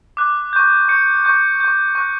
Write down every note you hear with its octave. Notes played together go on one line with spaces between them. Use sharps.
D6 F#6
C#6 G6
C#6 G6 C#7
C#6 G6
C#6 G6
C#6 F#6